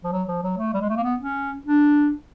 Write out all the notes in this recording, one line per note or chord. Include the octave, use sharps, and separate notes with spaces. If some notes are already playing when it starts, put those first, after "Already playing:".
F3
F#3
F3
F#3
A3
G3
G#3
A3
A#3
B3
C#4
D4